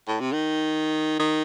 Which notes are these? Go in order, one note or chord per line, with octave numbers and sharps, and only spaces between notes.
A2
C3
D#3
D#3